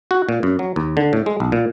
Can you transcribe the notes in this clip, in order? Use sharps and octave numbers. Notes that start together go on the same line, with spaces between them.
F#4
A#2
F#2
F#3
D#2
D3
A2
G#3
B1
A#2